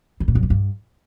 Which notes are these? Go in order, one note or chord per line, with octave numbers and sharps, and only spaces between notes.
D3
A#2
F#2
A#2
G2